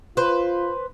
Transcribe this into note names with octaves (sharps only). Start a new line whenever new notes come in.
F4 B4 C5